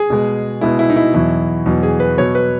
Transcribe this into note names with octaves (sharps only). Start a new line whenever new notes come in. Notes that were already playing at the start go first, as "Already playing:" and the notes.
Already playing: G#4
B2 G#3
B2 G#3 E4
E4
D#4
E4
E2 B2 F#3 E4
E2 B2 F#3
G#4
B4
B2 F#3 C#5
B4